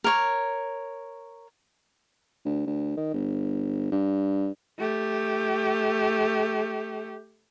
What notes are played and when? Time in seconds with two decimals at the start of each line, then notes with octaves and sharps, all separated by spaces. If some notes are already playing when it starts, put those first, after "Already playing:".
0.04 A#4 C#5
2.45 D2
2.66 D2
2.97 D#3
3.14 G1
3.92 G2
4.79 A3 G4